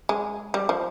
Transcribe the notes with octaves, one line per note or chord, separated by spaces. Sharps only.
G#3
G3
F3